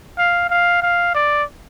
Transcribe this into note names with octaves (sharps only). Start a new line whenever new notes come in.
F5
F5
F5
D5